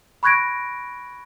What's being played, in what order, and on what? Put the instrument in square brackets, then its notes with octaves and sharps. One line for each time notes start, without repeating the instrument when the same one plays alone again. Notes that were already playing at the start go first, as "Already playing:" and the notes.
[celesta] B5 C#6 F#6 G#6 A#6 D7